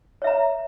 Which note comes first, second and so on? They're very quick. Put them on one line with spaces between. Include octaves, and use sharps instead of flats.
C#5 E5 A#5